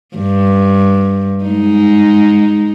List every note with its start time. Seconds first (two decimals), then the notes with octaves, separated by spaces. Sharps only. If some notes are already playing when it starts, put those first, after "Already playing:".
0.16 G2
1.45 G#3 D#4